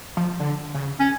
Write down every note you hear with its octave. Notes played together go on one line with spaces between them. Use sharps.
F3
D3
C#3
C#4